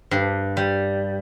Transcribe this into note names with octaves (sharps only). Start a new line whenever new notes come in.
G2
G3